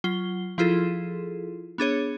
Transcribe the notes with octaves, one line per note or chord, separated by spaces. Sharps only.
F#3 F4 G7
F3 E4 F4 G#4 A4
B3 D4 G#4 C#5